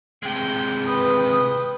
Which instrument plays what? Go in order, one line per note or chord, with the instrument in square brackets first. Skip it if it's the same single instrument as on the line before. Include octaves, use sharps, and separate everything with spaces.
[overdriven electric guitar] C3 G#3 [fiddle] G5
[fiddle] B4 G5 [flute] D#6